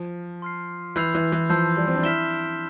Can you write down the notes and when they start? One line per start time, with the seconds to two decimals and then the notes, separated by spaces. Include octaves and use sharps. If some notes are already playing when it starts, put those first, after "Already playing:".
Already playing: F3
0.42 C6 F6 C7
0.96 E3 B5 E6 G6 C7 F7
1.14 E3
1.32 E3
1.50 F3 A5 C6 E6 G6 C7
1.77 G3
1.87 C4
1.96 D4
2.03 E4 F6 B6 E7 G7